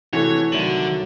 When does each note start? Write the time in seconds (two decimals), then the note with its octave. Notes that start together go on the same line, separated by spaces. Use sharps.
0.13 C3 E3 A3 F#4 C#5
0.52 C2 D3 D#3 F#3 A3 F#7